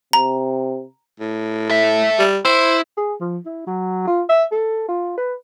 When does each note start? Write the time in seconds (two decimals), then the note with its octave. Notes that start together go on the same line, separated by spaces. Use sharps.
0.13 C3 A#5
1.20 A2
1.70 A4 E5
2.19 G3
2.45 E4 C5
2.97 G#4
3.20 F3
3.46 E4
3.67 F#3
4.07 F4
4.29 E5
4.52 A4
4.88 F4
5.17 B4